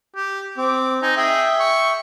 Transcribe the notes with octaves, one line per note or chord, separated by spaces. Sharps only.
G4
C4 D6
D#4 G#5
G#4 E5 G5
C#6